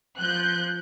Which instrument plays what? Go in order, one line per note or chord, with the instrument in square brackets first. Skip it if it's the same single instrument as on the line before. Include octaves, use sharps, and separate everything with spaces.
[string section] F3 F#6 G6